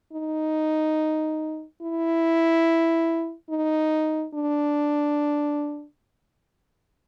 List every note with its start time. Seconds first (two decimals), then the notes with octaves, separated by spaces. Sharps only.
0.13 D#4
1.83 E4
3.50 D#4
4.34 D4